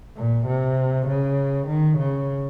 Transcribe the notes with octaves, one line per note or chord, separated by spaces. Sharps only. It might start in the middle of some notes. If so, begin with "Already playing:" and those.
A#2
C3
C#3
D#3
C#3